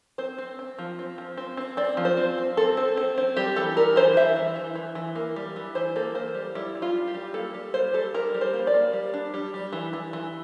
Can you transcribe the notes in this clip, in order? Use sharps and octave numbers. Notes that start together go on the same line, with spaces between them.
C4 C5
C4
C4
F3
C4
F3
C4
C4
C4 D5
F3
C5
C4
C4
C4 A4
C4
C4
C4
G3 G4
E3 A4
G3 A#4
E3 C5
E3 E5
E3
E3
E3
E3
A#3
G3
E3
E3 C5
A#3 A4
A#3 C5
G3
G3 E4
G3
F4
G3
G4
G3
A#3 A4
G3
A#3 C5
G3 A4
G3 A#4
G3
C5
A#3
D5
A#3
G3
D4
G3
G3
E3
E3
E3